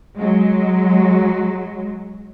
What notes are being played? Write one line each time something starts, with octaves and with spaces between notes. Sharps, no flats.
F#3 G#3